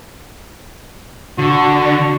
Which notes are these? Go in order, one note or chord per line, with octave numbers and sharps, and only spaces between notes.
D3 F#4